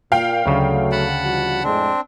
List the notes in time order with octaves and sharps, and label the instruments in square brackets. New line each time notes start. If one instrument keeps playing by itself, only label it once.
[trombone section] A#2 [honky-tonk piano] F5 G5
[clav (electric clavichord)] D2 C#3 [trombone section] F#3 A3
[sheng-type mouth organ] F#5 A5 B5
[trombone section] F3 G3 F#4
[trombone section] F2 A2 G#3 [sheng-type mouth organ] C4 D4